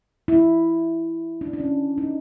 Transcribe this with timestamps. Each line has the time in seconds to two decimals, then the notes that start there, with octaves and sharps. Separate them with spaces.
0.28 E4
1.41 D4
1.53 D4
1.60 C#4
1.98 D#4